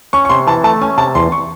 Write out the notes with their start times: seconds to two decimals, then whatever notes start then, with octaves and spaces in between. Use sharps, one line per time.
0.13 C#4 C#6
0.25 C#6
0.29 C3 C6
0.47 E3 A5
0.64 A3 A5
0.81 C#4 G#5
0.98 C3 A5
1.15 E2 C6
1.32 C#6